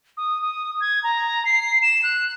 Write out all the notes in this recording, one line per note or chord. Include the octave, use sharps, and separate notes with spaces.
D#6
D#6
G#6
A#5
C7
E7
F#6